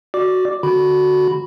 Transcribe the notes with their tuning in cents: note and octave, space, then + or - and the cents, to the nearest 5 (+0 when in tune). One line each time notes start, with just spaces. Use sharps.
F#4 +0 D5 +0 D6 +0
D3 +0 F#4 +0 B5 +0